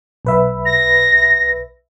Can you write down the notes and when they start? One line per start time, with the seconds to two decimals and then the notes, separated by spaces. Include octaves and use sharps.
0.25 B1 B4 E5
0.66 A#6